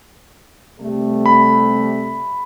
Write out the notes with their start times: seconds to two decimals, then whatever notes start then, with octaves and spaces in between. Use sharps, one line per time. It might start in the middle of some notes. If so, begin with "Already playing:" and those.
0.80 C3 G3 A3
1.26 B5